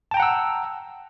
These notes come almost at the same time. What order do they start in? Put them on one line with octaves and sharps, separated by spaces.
A5 G5 A#5 F#5 E6